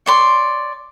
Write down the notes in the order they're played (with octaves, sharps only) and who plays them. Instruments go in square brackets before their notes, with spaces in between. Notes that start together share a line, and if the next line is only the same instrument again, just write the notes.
[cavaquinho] C#5 D5 C6